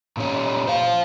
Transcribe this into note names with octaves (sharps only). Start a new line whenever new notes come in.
A#2 C#4
C5 F5